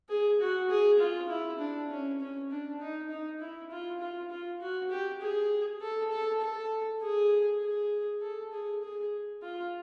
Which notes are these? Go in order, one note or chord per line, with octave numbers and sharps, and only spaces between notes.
G#4
F#4
G#4
F4
E4
D4
C#4
C#4
D4
D#4
D#4
E4
F4
F4
F4
F#4
G4
G#4
A4
A4
A4
G#4
G#4
A4
G#4
G#4
F4